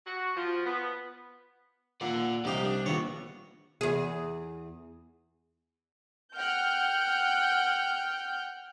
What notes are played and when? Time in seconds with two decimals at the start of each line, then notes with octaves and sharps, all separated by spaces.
0.05 F#4
0.35 F3
0.65 B3
2.01 A#2 D5 F#5
2.45 C2 D4 G4 D#5 F5
2.64 D4
2.86 A#1 D#2 B3 C#5
3.81 E2 G#4
6.34 F#5 G5 F6 G6